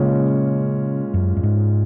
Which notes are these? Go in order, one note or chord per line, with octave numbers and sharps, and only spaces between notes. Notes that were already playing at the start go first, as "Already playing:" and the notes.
Already playing: A#2 C#3 G#3 C#4 F4
F#2
F#2
G#2